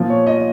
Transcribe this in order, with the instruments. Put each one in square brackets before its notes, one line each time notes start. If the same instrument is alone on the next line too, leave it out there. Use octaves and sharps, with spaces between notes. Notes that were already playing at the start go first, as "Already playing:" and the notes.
Already playing: [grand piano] A#2 F3
C#5
D#5